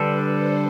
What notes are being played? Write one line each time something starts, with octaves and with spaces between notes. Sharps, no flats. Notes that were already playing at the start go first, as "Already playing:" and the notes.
Already playing: D3 G3 D4 A4 B4
C5